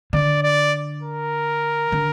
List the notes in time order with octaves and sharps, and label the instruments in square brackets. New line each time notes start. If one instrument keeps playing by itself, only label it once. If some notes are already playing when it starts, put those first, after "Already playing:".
[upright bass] D3 [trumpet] D5
[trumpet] D5
A#4
[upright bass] D3